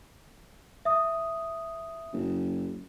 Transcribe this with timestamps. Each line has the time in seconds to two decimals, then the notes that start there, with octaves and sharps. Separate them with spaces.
0.85 E5 D#6
2.13 F#1